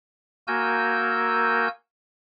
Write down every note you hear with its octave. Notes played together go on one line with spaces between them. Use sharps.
A#3 F#4 A#4 G#5 E6 G6